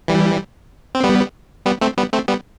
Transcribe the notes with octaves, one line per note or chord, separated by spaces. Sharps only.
E3 G3
C4
G3 B3
G3 B3
A3 C4
G3 B3
A3 C4
G3 B3